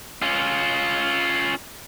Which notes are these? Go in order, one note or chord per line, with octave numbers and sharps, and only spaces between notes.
C#4 F4